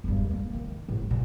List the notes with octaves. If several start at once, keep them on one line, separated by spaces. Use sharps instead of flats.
E2 G2
A#3
D#3
A2
A#2